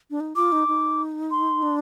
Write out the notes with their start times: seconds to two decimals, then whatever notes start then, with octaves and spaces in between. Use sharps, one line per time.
0.11 D4
0.20 D#4
0.36 F4 D6
0.52 D#4
0.68 D#4
1.31 C6
1.62 D4